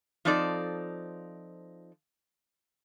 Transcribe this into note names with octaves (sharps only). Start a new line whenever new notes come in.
F3 C4 D#4 A4 D5